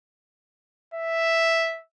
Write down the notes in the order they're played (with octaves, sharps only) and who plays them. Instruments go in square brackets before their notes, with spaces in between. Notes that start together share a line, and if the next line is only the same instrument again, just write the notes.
[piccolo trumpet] E5